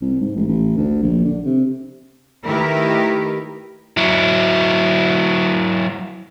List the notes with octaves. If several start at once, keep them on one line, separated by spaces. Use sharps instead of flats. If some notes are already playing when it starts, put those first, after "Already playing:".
C2
G#2
A1
A1
D2
A#1
D3
C3
D#3 A3 E4 G4 A#4 B4
F#3 E4